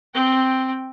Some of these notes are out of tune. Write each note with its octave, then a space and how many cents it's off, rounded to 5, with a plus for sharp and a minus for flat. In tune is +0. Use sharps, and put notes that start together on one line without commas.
C4 +0 G5 +0